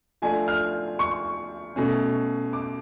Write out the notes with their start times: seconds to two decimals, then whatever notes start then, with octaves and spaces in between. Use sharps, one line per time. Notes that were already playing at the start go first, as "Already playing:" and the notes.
0.22 F3 A3 D4 G#5
0.48 F6
0.99 C#6
1.76 B2 A3 C#4
2.53 D6